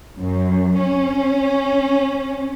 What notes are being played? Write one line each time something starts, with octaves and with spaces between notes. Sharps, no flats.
F#2
C#4